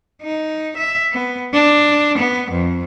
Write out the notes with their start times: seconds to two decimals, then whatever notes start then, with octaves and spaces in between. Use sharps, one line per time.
0.23 D#4
0.77 E5
1.12 B3
1.53 D4
2.18 B3
2.51 F2